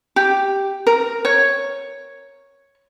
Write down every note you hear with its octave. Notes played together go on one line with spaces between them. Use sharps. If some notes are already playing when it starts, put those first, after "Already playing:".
G4
A#4
C#5